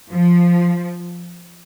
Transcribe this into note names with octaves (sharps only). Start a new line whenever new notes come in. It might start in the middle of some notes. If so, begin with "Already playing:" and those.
F3